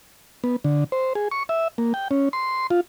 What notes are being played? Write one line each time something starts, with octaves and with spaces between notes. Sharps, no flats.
B3
D3
C5
G#4
C#6
E5
A#3
G5
C#4
C6
F4